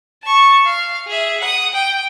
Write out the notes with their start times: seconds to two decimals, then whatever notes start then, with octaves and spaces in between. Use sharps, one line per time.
0.23 A5 C#6
0.66 F5
1.07 G#4 E5
1.40 F#5 D#6
1.73 G5